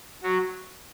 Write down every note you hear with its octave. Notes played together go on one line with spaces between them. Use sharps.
F#3 F#4